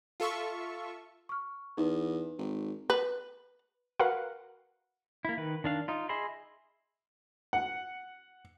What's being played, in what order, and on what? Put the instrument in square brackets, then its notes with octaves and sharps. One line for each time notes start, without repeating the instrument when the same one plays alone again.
[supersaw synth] F4 A4 E5 C#6
[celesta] C#6 F6
[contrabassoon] E2 [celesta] D#4 B4
[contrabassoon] G#1
[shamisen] B4
[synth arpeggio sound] F#4 A#4 B4 F5 F#5
[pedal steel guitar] A#3 E4
D#3 B4
D#3 D4 F5
D#4 F4
G#4 D#5 E5 B5 C6
[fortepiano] F#5